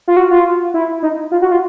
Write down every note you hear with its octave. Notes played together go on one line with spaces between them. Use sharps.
F4
F#4
F4
E4
D#4
F4
F#4
F4